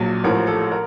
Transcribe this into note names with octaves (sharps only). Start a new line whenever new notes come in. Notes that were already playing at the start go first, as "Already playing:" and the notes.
Already playing: A#1 A#2 F#3
A1 A2 F3 A#4
A4
A#4